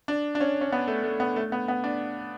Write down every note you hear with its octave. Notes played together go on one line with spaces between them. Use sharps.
D4
D4
C#4
C#4
B3
A3
A3
B3
A3
B3
B3
D4